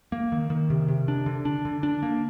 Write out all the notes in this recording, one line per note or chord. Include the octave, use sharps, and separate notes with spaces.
A#3
D#3
D#3
C3
C3
D4
D3
D4
D3
D4
A#3